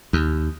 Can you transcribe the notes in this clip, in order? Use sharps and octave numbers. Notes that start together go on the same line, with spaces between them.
D#2